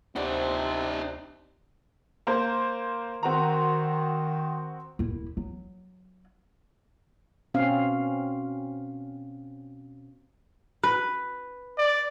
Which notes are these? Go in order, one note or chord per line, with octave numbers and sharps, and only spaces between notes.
D2 C3 C4 D#4 F#4 C5 D5
A#3 C5
D#3 C4 F#4 A#5
D#1 E4
F#3
B2 C4 C#4 F5
B4
D5